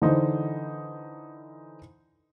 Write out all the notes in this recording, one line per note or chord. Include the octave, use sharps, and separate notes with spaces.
D3 E3 D#4 C5